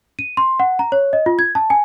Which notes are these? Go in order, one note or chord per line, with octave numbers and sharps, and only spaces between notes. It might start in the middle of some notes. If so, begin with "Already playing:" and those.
D#7
C6
F#5
A#5
C#5
D#5
F4
G#6
A5
G#5